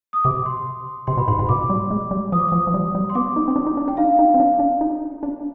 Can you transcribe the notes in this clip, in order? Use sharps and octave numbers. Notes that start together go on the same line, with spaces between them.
D#6
C3 D6
C6
C3 C6
B2 B5
G#2 C6
G#2 B5
B2 D6
G3
G#3
G3
F3 D#6
D6
F3 D#6
F3
G3
G3
C6
B3 D6
D#4
C4
D4
D#4
D4
D4 G5
D#4 F5
D#4
C4
D4
D4
D#4
D4